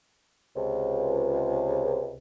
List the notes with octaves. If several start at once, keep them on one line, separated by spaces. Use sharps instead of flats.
C#2 C3